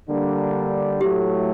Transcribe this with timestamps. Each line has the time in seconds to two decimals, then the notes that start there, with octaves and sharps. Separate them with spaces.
0.08 D3 G3 A#3 D4
1.01 A2 F#3 A3 G4